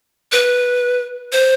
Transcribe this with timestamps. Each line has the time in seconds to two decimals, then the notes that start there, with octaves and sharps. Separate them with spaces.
0.32 B4
1.32 C5